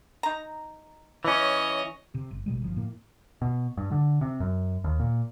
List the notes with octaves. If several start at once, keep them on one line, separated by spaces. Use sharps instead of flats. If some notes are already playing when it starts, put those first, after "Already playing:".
D#4 A#5
E3 C#4 C#5 D#5
C3
G1
A1 B2 G3 G#3
G1 F3
A2 A#3
B2
G2
D3
C3
F#2
D#2
A#2